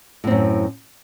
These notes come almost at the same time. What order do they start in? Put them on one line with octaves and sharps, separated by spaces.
A2 C4 F#2